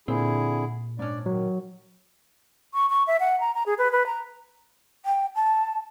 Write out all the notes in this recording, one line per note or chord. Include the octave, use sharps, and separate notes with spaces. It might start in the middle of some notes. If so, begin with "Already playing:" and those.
A#2 D3 C4 E4 G#4
G#2 C#4 D4 D5
D#3 F#3
C#6
C#6
E5
F#5
A#5
A#5
G#4
B4
B4
A#5
G5
A5